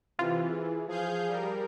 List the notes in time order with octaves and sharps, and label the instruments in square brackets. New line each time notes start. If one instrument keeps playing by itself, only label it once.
[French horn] C3 [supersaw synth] E3 [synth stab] F4
[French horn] G#4
[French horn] F3 [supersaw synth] G#4 F5 G6
[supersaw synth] G3 A#4